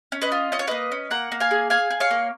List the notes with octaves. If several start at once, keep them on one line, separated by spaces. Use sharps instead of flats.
C#4
B4 D#5
F4
C#4 D#5
C#5
A#3 B4 D#5
C#4
A#3 F#5 A#5
A#3
F5 G#5
G#4
G#4 F5 G#5
G#4
C#5 F5
A#3